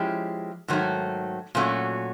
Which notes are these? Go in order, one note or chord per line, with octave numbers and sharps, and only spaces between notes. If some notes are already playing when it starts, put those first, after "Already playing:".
Already playing: F3 G#3 C#4 E4 G4
G#2 D#3 F#3 A3
A#2 F#3 A3 C#4 F#4